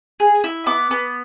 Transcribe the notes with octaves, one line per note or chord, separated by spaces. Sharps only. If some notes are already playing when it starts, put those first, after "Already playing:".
G#4
E4
B3 D6
B3